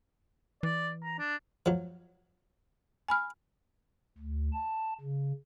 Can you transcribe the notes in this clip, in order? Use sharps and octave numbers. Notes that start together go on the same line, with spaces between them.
E3 D5
A#5
D4
F3 F#3
G#5 B5 F6
D2
A5
C#3